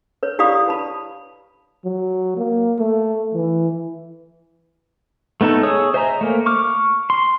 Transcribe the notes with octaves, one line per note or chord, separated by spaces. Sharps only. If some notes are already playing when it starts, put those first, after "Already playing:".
B4 C#5
E4 G4 D5 F5 B5 D#6
B4 A5 B5
F#3
A#3
A3
E3
A3 B3 D#4 A4
G#4 C#5 D#6 E6
C5 D#5 E5 G#5 A#5
A3 A#3
C#6 D6 F6
C6